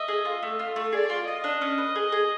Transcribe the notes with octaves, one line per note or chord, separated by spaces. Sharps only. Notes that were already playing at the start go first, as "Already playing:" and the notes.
Already playing: D#5 E5
G#4
F4
A3
F4
A3
G#4 D5
F4
F4 D#5
D4
C#4
B4
G#4
G#4